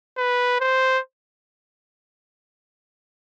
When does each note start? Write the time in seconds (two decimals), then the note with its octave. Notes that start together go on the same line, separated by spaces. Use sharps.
0.17 B4
0.60 C5